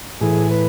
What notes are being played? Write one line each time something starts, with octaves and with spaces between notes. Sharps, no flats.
A2 E3 G#4
B4